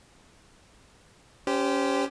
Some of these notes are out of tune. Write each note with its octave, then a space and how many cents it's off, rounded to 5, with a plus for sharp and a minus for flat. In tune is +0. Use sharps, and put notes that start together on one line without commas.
C#4 +15 G4 +0 C5 -20